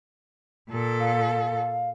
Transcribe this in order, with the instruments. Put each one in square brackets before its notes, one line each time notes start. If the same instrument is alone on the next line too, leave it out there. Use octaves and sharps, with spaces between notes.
[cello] A#2 A4
[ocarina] F5